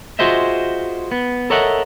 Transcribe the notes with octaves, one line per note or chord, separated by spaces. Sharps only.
F4 F#4 G#4 C5 D#5 E5
B3
A4 A#4 C#5 D#5 E5 F#5